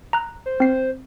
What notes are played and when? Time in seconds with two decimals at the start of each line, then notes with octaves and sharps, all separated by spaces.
0.13 A#5 F#6
0.46 C5
0.60 C4 C7